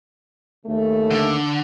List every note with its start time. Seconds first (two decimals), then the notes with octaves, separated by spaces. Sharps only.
0.66 D#2 C#3 A3
1.11 D3